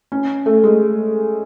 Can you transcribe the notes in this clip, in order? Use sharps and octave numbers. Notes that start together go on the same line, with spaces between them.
C#4
A3
G#3